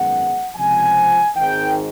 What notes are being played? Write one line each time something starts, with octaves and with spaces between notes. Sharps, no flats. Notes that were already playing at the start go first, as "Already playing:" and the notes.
Already playing: G#1 F#2 D#3 G#3 B3 F#5
C#2 C3 F3 G#5
G#1 G#2 D#3 G5